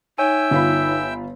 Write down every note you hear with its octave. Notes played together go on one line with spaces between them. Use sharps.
D#4 C#5 E5 G5 G#5 E6
G1 F4 B5